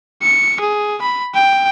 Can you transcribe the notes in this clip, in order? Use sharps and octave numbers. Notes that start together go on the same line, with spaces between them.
C#7
G#4
B5
G5